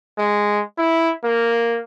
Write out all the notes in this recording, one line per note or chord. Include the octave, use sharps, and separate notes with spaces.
G#3
E4
A#3